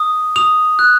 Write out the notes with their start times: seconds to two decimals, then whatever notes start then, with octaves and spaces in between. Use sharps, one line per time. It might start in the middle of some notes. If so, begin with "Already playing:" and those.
Already playing: D#6
0.36 D#6 F7
0.79 F#6